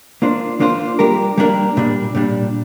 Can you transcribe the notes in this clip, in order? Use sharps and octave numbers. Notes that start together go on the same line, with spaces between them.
A#3 D4 F4 C5
A#3 D4 F4 C5
G3 A#3 D4 G4 A#4
G3 A#3 D4 G4 A#4
A#2 G3 D4
A#2 G3 D4